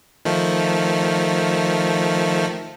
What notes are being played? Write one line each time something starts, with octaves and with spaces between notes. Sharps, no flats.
D#3 F3 A3